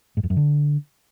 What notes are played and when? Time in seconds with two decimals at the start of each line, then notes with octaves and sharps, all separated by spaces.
0.17 G#2
0.23 F2
0.30 F#2
0.37 D3